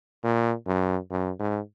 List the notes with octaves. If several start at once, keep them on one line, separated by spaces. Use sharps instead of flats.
A#2
F#2
F#2
G#2